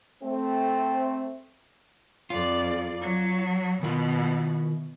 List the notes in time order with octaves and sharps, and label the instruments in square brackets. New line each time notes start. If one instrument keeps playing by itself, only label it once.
[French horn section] A3 C4
[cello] F2 D5 [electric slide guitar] F4
[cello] F#3
[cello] B2 [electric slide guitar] D#3 E4 F4